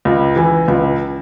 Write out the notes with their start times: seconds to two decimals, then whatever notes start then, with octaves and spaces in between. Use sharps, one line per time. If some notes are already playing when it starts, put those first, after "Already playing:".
0.05 C#2
0.36 E3
0.68 C#2